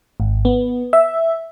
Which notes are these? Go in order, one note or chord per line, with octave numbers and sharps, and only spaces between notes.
G#1
B3
E5